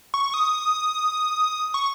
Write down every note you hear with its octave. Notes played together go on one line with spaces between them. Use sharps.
C#6
D#6
C#6